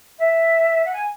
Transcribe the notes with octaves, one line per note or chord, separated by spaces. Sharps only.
E5
F#5
G#5